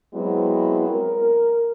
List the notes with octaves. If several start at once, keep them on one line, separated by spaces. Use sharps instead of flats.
F#3 G#3 B3 C4 E4
A#4